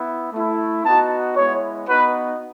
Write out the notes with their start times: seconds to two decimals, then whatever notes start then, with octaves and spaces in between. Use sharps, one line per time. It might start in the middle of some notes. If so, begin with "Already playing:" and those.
Already playing: B3 E4
0.32 A3 E4
0.84 B3 D#4 F#4 A5
1.36 G#3 B3 E4 C#5
1.88 B3 D#4 F#4 B4